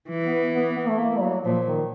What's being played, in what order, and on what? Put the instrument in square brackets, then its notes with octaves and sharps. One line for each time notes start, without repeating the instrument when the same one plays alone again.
[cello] E3
[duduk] B3
B3
B3
A3
A#3
G3
F#3
[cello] A#2 [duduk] F3
[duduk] D#3